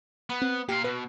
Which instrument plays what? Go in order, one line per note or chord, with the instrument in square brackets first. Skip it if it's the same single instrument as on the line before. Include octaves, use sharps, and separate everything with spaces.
[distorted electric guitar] B3 [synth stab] B4
[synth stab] C4
[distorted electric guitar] A#2 F5 [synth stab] G4
[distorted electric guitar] B2 [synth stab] B4